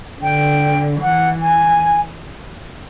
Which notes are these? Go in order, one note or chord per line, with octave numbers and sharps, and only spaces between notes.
D3 G5
E3 F#5
G#5